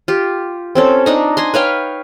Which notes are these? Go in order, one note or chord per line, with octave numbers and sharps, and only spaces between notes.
F4 G4
C4 C#4 A4
D4 D#4 A#5
G#5 A#5 C6
B4 C#5 F5 G5